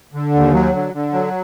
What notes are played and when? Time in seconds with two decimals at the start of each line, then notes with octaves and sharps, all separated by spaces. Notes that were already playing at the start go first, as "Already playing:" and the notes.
0.14 D3
0.34 D#2
0.54 F#3
0.74 D3
0.94 D3
1.13 F#3